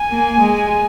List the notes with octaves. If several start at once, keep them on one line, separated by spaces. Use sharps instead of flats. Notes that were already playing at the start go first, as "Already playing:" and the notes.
Already playing: G#5
A#3
G#3